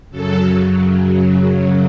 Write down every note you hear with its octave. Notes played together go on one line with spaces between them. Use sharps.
F#2 C#3 F#3 A4